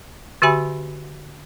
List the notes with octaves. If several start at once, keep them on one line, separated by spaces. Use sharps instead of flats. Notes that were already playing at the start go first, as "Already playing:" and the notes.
D3 F#4 G4 E5 G#5 B5